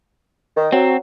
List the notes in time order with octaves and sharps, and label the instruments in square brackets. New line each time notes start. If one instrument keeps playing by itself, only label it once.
[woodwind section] D#3
[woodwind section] F#3 [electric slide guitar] C4